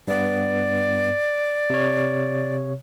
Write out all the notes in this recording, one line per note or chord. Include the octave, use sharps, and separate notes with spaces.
G2 B3 D5
C3 C#5